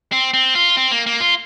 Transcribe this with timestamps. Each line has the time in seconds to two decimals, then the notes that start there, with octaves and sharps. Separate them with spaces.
0.12 C4
0.34 C4
0.55 F4
0.77 C4
0.91 A#3
1.07 A#3
1.20 F4